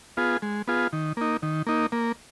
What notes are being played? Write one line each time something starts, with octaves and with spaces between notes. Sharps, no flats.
B3 F4 G#4
G#3
B3 F4 G#4
D#3
A#3 D#4
D#3
A#3 D#4
A#3